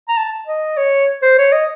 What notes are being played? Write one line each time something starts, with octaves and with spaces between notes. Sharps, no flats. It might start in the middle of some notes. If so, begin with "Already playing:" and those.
A#5
A5
D#5
C#5
C5
C#5
D#5